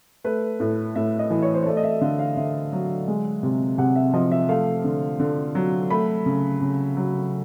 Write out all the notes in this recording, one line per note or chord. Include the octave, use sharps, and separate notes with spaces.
A3 B4
A2
A2 E5
D#5
E3
C#5
C5
C#5
A3 D5
D#5
E5
D3 F5
F5
D3 E5
F#3
G#3
C3
C3 F#5
E5
F3 D#5
E5
A3 F5
D3
D3
F#3
A3 B5
C#3
C#3
F#3